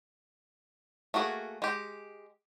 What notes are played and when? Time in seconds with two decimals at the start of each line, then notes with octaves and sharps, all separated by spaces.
1.14 A3 A#3 F#4 G#4
1.62 G#3 G4